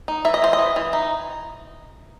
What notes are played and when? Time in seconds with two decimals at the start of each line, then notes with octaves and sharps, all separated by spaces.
0.08 D#4
0.25 E3 E5
0.34 D#5
0.42 E3 C5
0.53 D#5
0.59 E3
0.76 E3
0.93 D#4